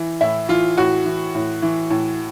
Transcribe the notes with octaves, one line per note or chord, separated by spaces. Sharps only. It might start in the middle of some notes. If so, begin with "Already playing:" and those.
Already playing: E3
A2 E4
E3 F4
A2 F#4
E3
A2
E3
A2